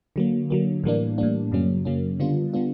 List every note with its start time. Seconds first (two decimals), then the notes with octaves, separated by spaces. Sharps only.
0.16 D3 F#3 A#3
0.50 D3 F#3 A#3
0.84 A2 E3 G3 A#3 D4
1.18 A2 E3 G3 A#3 D4
1.51 F#2 C#3 F#3 A#3 C#4
1.85 F#2 C#3 F#3 A#3 C#4
2.20 D3 G3 B3 D4 F4
2.53 D3 G3 B3 D4 F4